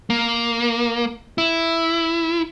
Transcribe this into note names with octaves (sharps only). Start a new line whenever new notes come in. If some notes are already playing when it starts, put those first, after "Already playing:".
A#3
E4